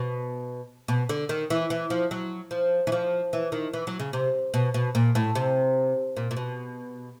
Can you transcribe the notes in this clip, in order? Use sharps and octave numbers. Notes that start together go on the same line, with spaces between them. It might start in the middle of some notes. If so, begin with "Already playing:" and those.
Already playing: B2
B2
D3
D#3
E3
E3
F3
F#3
F3
E3
F3
E3
D#3
E3
F#3
C#3
C3
B2
B2
A#2
A2
C3
A#2
A#2
B2